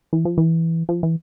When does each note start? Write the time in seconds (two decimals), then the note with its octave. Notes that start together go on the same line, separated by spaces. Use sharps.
0.13 E3
0.25 F3
0.38 E3
0.89 F3
1.03 E3